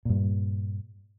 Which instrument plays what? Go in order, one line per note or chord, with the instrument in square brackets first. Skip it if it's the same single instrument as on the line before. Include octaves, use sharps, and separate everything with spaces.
[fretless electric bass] G2 A#2